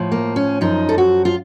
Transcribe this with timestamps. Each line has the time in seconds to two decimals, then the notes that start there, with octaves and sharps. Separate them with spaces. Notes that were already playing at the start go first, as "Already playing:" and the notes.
Already playing: A2 F3
0.12 A#3
0.36 C#4
0.61 F#2 F3 D#4
0.89 A4
0.98 F#4
1.25 F4